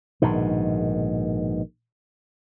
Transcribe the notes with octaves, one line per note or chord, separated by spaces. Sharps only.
A#1 G#2 B2 D#3